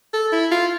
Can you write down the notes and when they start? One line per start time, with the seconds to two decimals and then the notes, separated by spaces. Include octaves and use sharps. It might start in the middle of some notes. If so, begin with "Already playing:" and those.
0.14 A4
0.33 E4
0.52 F4